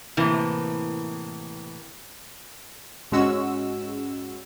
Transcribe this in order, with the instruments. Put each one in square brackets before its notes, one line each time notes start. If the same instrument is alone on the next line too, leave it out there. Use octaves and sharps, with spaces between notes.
[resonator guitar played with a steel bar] A2 C3 E3 A#3
[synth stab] G#2 G#3 C#4 F#4 E6